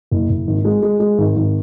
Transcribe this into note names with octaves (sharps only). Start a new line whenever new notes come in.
F#1
F#1
G#1
G#3
G#3
G#3
G#1
G#1